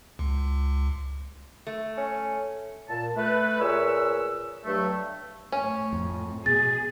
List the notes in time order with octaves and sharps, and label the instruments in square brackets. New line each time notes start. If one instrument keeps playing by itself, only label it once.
[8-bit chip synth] C#2
[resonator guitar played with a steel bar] A3
[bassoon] C#4
[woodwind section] A#2 A5
A3 B4
A#2 G#4 B4 C#5 E6
G2 F#3 A3
[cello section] A2 [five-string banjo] C#4
[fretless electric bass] F2
[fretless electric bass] B2 [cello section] G#4 [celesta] A6